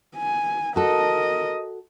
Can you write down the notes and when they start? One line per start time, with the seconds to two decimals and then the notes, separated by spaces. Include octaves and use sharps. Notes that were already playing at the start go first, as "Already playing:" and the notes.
0.16 G#5
0.76 F#4 A4 A#4 D#5